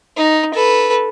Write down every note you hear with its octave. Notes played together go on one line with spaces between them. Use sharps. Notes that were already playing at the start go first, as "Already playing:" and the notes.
D#4
A4 B4